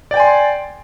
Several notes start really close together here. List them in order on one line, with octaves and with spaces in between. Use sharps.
D5 G5 G#5 C6